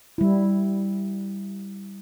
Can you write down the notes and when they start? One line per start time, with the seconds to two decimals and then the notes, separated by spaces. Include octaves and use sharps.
0.18 G3 E4